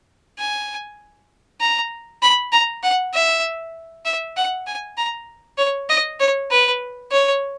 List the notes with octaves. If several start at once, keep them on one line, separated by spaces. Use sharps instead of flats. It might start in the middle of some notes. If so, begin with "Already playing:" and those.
G#5
A#5
B5
A#5
F#5
E5
E5
F#5
G#5
A#5
C#5
D#5
C#5
B4
C#5